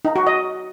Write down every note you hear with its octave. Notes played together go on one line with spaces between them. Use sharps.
D#4
F#4
D#5